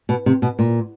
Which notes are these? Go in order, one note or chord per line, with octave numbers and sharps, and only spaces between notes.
B2
C3
B2
A#2